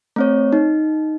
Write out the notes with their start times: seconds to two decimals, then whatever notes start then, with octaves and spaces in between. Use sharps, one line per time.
0.16 A3 C4 C#5
0.53 D#4